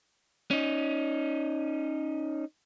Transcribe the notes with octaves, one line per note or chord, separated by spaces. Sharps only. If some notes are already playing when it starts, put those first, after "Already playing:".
C#4 D#4